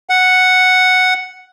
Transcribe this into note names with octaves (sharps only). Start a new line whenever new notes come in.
F#5